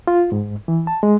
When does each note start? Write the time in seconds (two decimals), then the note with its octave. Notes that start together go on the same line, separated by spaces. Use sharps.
0.07 F4
0.32 G#2
0.68 E3
0.87 A5
1.03 G#3